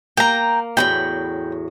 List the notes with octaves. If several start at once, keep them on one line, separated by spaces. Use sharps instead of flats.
A#3 G5 A#5
E2 A2 F#3 G5 B5